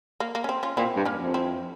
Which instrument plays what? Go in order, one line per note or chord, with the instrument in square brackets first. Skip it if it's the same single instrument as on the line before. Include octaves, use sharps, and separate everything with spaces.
[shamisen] A#3
A#3
C#4
C4
C#4 F4
[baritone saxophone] A#2 [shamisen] C4 E4
[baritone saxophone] G2
[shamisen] A#3 C#4
[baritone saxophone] F2
[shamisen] C4 E4